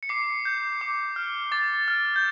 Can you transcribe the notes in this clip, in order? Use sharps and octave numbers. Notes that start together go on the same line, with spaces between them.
C#7
D6 C7
G6
D6
F6
D6 A6
F6
G6